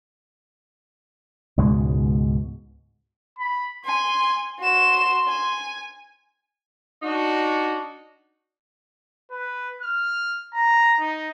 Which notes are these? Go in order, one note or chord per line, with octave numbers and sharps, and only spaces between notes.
C#2 G#2 B2 G#3
B5
G#5 C6
F#4 C6 E7
G#5
D4 D#4 F#4
B4
F6
A#5
D#4